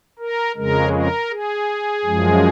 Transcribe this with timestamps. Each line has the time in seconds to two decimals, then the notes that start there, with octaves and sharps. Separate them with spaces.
0.19 A#4
0.56 F2 C#3 G#3 A#4
0.93 A#4
1.31 G#4
2.05 F#2 F3 G#3